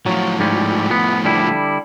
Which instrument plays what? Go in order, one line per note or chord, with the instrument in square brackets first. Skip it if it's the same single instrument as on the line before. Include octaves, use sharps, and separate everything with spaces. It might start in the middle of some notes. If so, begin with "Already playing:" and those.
[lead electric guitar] A2 F3 [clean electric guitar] F#3
[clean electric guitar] G#2 G3 C#4
B3
D3 G3 E4